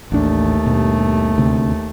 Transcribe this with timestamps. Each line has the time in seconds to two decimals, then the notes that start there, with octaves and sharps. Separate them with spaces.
0.12 A1 D#2 A3 D4
0.66 G2 B2
1.38 D2 C3